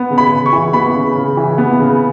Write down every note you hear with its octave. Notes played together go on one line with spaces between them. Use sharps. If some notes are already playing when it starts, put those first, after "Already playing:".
Already playing: B3
C#3
B5
C#3
C#6
E3
B3 B5
C#3
C#3
E3
B3
C#3